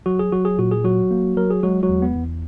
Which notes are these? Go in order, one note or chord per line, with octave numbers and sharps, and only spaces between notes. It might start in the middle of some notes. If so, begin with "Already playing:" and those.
F#3 F#4
G#4
F#3 F#4
G#4
A#2 F#4
G#4
F#3 F#4
A#3
F#3 A#4
G#4
F#3 G#3 F#4
F#3 F#4
E2
B3
E2